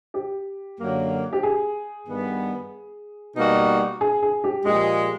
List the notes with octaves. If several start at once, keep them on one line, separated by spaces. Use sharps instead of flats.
G4
F#2 D3 F#3 A#3
G4
G#4
G2 D#3 G3 B3
B2 G3 A#3 D#4 F#4
G#4
G#4
G4
A#2 F3 G#3 G4